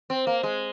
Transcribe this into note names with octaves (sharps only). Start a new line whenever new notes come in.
C4
A#3
G#3